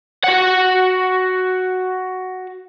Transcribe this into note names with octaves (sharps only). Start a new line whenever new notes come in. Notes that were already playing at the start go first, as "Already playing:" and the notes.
F#4 F#5